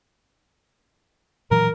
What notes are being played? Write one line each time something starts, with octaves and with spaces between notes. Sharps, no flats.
A#2 E3 F#3 A#4